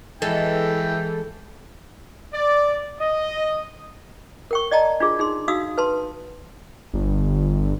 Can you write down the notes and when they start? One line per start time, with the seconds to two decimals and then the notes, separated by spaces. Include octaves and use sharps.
0.22 E3 G#3 E4 A4 G5
2.32 D5
3.00 D#5
4.51 A#4 G5 C#6
4.71 D5 D#5 G5 A5 A#5
5.00 D4 F4 G#4
5.19 D#4 G#4 C6
5.48 D#4 F#4 F5 D#6 E6
5.78 B4 A5 C6
6.93 G1